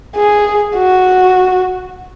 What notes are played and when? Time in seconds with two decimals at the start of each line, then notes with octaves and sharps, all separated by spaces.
0.16 G#4
0.75 F#4